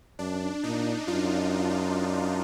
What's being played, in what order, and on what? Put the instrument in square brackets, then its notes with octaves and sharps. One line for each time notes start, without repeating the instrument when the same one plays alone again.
[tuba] F#2 [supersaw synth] D4
[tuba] A#2 [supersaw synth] D#4
[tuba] F#2 [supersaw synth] F4